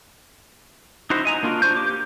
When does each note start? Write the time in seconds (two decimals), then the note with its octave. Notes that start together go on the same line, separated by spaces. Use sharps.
1.10 D#4 E4 F#4 C5
1.25 D#5 G#5 A#5
1.43 A#3 D4 F4 F#4
1.62 D4 F4 C5 C#6 G6
1.76 G4 D6